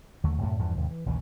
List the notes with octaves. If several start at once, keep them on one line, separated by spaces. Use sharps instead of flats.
D#2 D3 F#3 A3
F#2 A2 C3
E2 G2 F3
D#2 G#2 C3
E3
A#1 D#2 C#3 E3